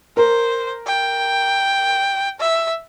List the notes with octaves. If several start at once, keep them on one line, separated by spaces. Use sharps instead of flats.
A#4 C5
G5
E5